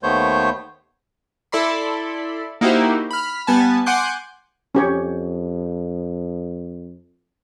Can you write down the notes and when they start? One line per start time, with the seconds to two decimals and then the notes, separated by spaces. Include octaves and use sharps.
0.03 D#2 A3 B3 C5 C#5 G6
1.52 E4 A4 D5 B5 C6
2.61 A#3 D#4 E4 F#4 G4 C5
3.11 B5 F6
3.47 G3 B3 G#5 A5
3.86 F#5 G#5 C6 D6 F#6 G6
4.75 F2 C#4 G4 C#5